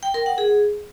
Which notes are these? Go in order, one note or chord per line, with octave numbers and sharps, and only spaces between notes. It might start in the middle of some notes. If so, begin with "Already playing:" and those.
G5
A#4
F#5
G#4